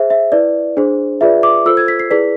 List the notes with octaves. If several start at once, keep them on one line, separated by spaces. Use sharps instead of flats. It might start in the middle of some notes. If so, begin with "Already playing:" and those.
Already playing: G#4 C5 E5
E5
E4 B4 D5
D4 G#4 C5
F4 G#4 B4 D5 E5
D6
F4 A4 C5 E6
G#6
B6
C7
E4 G#4 B4 D5 B6